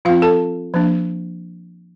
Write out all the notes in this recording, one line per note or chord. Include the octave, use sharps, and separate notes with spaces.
F3 C4 F4 F5
A4 A5
F3 A#3 D4